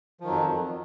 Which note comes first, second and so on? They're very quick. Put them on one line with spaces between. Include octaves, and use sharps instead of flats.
F3 D#3 F#3 F2